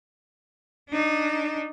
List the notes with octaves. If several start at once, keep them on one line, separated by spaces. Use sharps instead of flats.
D4 D#4